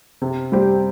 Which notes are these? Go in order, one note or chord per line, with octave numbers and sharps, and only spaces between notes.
C3
G3 C4 G4